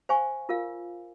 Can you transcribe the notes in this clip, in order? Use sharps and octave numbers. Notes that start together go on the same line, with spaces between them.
C5 F5 G#5 C#6
F4 A#4 F5